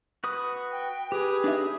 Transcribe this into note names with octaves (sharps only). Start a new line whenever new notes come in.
F#4 B4 D#6
G5
G4 G#4 B4
D4 D#4 E5